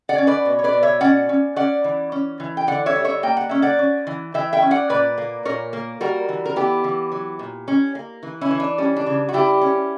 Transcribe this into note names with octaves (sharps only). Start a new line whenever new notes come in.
D5 F#5
C#4
B4 D5
B2
C#5
B4 D5
B2
C#5 E5
C#4 D5 F#5
C#4
C#4 D5 F#5
E3
C#4
E3
G5
D3 D5 F#5
C#5 E5
G3
C#5 E5
A#3 G5
F#5
C#4 E5
D5 F#5
C#4
E3
E3 E5 G5
E5 G5
C#4
D5 F#5
A#2 B4 D5
A#3
A#2 A#4 C#5
A#3
G3 F#4 A#4
E3
A#4
B3 E4 G4
E3
F#3
A#2
C#4
A#3
E3
C#4 E4
E3
D4
G3 C#4
D4
C#3
F#4
G3 E4 G4
C#4